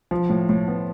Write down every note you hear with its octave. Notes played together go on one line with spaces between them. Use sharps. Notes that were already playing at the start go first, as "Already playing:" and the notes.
F3
A2
A2
B3